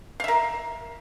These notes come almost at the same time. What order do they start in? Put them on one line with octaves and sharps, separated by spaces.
F5 E5 A#4